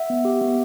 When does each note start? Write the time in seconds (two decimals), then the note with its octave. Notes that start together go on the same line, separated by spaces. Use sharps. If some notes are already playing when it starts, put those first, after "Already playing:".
Already playing: E5 F#5
0.10 B3
0.25 G4
0.41 B3